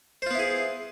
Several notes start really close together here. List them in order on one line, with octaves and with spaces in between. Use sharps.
C5 F4 B3 E4 G#4